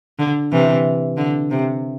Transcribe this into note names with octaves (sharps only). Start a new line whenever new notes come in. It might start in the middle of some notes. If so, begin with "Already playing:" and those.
D3
C3 E3
D3
C3